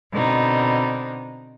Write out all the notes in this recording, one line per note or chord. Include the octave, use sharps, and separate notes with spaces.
B2 D3 C4 D#4